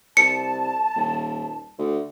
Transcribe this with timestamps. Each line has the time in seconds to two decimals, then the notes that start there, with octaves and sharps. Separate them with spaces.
0.17 C2 A5 C#7
0.95 D#1
1.78 D2